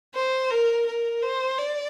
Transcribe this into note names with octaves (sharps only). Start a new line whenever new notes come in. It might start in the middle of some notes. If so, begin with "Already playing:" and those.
C5
A#4
A#4
C5
D5